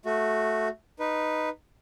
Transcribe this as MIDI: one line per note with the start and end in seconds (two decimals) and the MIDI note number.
0.06 0.68 57
0.06 0.68 66
0.99 1.49 63
0.99 1.49 71